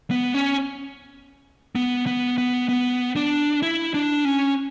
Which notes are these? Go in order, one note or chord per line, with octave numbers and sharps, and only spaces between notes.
B3
C#4
B3
B3
B3
B3
D4
E4
D4
C#4